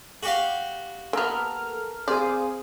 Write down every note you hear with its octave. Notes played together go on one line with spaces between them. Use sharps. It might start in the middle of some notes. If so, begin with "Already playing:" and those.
F#4 G4 F5
A#3 B3 A4 A#4 F6
C4 G#4 C5 D5 F5 D#6